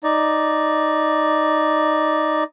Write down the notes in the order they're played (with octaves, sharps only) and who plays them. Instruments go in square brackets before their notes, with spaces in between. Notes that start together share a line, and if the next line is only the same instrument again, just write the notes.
[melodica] D#4 D5